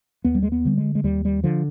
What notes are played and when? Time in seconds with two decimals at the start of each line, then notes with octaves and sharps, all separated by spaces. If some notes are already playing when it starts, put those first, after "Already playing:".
0.24 D#2 B3
0.35 G3
0.43 G#3
0.52 B3
0.65 D3 G3
0.78 G#3
0.95 G#3
1.04 D#2 G3
1.25 G3
1.44 D3 F3